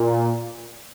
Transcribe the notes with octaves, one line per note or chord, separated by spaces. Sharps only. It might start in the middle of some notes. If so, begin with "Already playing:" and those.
Already playing: A#2